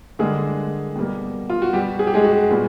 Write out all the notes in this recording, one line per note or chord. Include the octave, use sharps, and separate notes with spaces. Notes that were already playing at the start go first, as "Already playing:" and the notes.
D3 G3 G#3 A#3 G#4
B2 G3 A#3
F4
F#4
B2 G3 B3 G4
G#4
G4
G#3 G#4
F#4
A#2 G3 B3